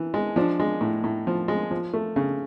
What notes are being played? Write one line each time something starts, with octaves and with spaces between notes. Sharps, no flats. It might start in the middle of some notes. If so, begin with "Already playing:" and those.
Already playing: E3
G#3
F3 D4
G#3
A2
A2
F3
G#3
F3
A3
C#3